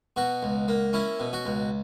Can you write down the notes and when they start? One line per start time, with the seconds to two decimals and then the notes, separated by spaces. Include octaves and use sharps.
0.16 B2 F#4
0.43 C#2
0.68 A#3
0.93 C#4 E4
1.20 B2
1.33 F#4
1.45 C#2